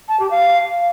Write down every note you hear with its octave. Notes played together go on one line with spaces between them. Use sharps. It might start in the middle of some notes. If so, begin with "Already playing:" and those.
A5
G4
F5